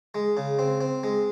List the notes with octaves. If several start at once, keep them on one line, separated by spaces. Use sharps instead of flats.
G#3
C#3
C4
C4
G#3